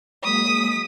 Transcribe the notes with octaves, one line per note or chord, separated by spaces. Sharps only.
F#3 G#3 A#3 D#6 B6